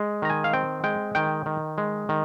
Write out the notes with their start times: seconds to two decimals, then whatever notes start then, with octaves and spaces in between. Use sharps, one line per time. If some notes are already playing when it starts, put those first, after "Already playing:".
Already playing: G#3
0.22 D#3 A#5
0.30 G#5
0.44 F5
0.53 C4 G5
0.84 G#3 G5
1.15 D#3 G5
1.46 D#3
1.78 G#3
2.09 D#3